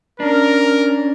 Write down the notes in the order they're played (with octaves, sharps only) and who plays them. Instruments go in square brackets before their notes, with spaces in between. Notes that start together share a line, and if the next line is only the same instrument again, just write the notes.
[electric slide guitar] C#4 D4 [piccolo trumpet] A#4